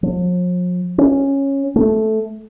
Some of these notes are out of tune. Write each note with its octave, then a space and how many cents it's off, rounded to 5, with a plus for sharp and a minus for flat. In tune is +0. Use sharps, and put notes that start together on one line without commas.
F3 +45
C#4 -10
A3 -10